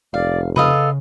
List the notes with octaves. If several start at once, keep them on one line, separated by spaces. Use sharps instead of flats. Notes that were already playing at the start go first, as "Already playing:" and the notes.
F1 D5 F5
C#3 A4 B4 D#5 F5